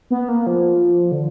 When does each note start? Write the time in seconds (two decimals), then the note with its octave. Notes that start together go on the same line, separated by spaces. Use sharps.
0.11 B3
0.28 A#3
0.47 F3
1.12 D3